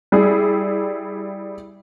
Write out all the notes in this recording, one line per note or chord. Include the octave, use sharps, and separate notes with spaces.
G3 E4 G#4